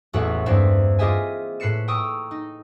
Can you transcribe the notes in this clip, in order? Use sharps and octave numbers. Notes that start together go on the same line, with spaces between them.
A1 E2 A2 F#4 E5 F#5
E2 G2 A3 A#3 C4 E5
F4 G4 G#4 D#5 E5 G#5
A2 B4 C7 C#7 E7
G5 A#5 C#6 D#6 E6
D#4